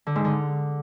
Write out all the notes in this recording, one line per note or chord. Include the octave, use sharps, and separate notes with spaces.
D3
G#2
D3